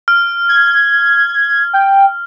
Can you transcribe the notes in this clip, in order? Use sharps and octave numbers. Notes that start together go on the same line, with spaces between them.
F6
G#6
G5